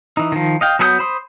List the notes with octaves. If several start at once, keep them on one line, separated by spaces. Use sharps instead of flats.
E3 D#4
D#3 F3
D#5 F5 G5
F#3 B3 G#4 D#6 G6
C5 B5 C6 D#6